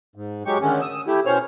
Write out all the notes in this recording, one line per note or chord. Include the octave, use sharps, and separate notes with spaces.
G#2
F#3 G#3 G4 C#6
D3 D#3 G#3 A3 C#4
D#6 E6
A3 E4 G4
B2 C#4 C5 C#5 F6